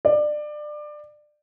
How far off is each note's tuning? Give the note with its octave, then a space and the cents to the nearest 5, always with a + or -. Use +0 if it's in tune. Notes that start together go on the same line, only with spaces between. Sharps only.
D5 +25